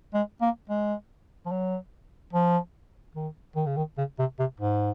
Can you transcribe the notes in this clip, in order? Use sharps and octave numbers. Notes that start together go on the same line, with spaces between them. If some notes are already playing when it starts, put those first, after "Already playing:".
G#3
A#3
G#3
F3
F#3
F3
D#3
D#3
C#3
D#3
C#3
C3
C3
G#2